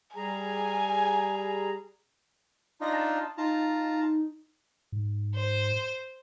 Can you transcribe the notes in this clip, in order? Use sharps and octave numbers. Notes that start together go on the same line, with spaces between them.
G3 G#4 G#5 A#5
D4 D#4 F4 A#6
A5
D#4 F4 A5 A#5
G#2
C5